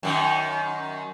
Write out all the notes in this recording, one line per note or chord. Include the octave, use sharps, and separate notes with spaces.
F#2 D#3